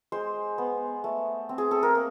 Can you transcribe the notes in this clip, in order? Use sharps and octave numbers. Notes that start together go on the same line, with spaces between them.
G#3 C5
B3
A3
C4
G#4
A4
A#4
A#3